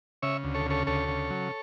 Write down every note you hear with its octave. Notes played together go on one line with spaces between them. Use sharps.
C#3 C#5 E5
D2
A4 C#5
C#3 A4 C#5
D2 A4 C#5
C#3
F#3